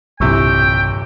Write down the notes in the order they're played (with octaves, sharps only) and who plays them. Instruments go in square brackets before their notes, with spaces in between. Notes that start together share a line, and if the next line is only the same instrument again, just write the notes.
[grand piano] D#1 C3 E3 [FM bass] B1 [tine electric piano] G2 C#6 E6 [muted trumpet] G5